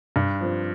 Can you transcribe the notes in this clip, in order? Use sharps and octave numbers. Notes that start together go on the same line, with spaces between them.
G2
F3 C4